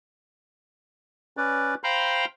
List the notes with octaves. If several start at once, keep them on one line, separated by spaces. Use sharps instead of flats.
C#4 B4 D5
C5 F5 G5 A#5 B5